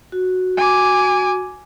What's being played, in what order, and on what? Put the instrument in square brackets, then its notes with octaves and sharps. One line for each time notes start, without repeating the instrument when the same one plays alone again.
[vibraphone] F#4
[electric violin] G#5 D6